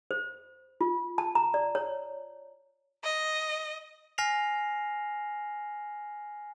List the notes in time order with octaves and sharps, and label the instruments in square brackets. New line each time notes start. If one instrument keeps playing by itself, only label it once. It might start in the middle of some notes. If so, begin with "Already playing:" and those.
[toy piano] C5
F4
A5
A#5
D5
C#5
[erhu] D#5
[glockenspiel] G#5 F6 A#6 C7 F7